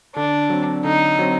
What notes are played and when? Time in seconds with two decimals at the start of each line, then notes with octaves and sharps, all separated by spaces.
0.15 D3 D4
0.50 F#3 C4
0.84 D3 D#4
1.19 F#3 C4